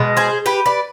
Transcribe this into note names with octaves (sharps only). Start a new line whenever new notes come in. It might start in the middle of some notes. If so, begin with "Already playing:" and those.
Already playing: B2 G#3
G#4 C5
G4 B4
B4 D5